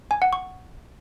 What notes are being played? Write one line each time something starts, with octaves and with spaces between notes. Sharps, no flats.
G#5
F#5
C#6